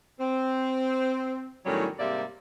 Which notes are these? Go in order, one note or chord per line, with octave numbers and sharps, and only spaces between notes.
C4
E2 A2 D#3 F#3 G3 C#4
G#2 C3 G3 A#3 D5 E5